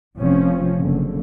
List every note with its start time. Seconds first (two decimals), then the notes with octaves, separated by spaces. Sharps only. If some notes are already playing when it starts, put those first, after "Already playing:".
0.18 F1 C3 F3 C4 C#4
0.79 F#1 D3